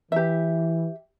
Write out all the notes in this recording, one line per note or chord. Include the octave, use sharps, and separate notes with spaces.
E3 G4 E5